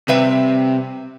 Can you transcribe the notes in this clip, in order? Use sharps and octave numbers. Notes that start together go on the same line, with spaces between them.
C3 G3 B4 E5